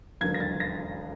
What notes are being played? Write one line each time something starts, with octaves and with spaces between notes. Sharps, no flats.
E1 D#2 D3 F#3 G#6
A#6
A6
A#6